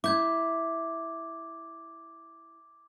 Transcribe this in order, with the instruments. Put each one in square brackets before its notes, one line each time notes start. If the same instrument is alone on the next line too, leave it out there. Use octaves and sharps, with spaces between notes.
[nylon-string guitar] E4 [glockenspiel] D6 G6 G#6